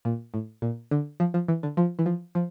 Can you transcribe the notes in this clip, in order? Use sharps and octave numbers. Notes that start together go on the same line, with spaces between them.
A#2
A2
A#2
D3
F3
F3
E3
D3
F3
E3
F3
F3